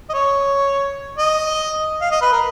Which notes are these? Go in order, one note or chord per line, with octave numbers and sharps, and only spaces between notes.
D#5
C#5
D#5
F5
D#5
B4
A#4